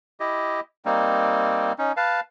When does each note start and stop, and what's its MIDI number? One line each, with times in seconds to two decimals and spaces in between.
0.20 0.60 64
0.20 0.60 67
0.20 0.60 75
0.85 1.72 55
0.85 1.72 58
0.85 1.72 60
0.85 1.72 63
1.78 1.92 61
1.78 1.92 63
1.97 2.20 71
1.97 2.20 77
1.97 2.20 81